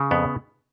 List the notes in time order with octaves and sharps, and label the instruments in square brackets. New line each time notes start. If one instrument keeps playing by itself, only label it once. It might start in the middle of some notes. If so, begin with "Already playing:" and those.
Already playing: [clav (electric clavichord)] C#3
F2 B3